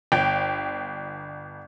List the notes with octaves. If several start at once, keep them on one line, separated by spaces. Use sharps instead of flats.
G1 G5